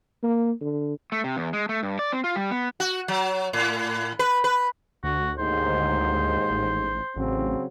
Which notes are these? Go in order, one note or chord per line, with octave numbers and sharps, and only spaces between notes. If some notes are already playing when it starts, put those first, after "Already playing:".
A#3
D3
A3
C3
E2
G#3
A3
G2
D5
C4
F4
G3
B3
F#4
F#3
A2
B4
B4
D2 F#4
D#2 G#2 C5
A1
A1 C#3 F#3 C4